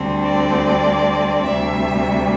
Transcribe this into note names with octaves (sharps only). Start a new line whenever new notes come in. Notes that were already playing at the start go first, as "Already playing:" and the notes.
Already playing: D2 D3 G3 C4
D5
D2 C3 G3 E5